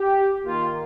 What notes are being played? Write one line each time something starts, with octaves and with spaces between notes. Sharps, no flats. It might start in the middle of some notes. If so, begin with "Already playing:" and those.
Already playing: G4
D#3 A#3 F4